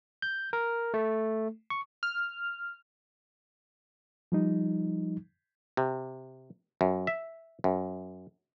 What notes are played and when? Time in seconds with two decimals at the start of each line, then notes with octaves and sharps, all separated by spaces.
0.22 G6
0.53 A#4
0.94 A3
1.70 C#6
2.03 F6
4.32 F3 G3 D#4
5.77 C3
6.81 F#2
7.07 E5
7.64 F#2